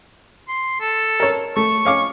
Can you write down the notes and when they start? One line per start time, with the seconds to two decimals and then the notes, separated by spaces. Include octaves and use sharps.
0.49 C6
0.81 A4
1.20 A#4 C#5
1.57 A3 C#6
1.85 C#4 F5 D6